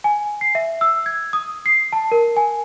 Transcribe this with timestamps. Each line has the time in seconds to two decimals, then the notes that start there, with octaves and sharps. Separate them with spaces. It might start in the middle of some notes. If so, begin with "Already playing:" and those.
0.04 G#5
0.41 C7
0.55 E5
0.81 E6
1.06 G#6
1.33 D#6
1.66 C7
1.93 A5
2.12 A#4
2.37 G#5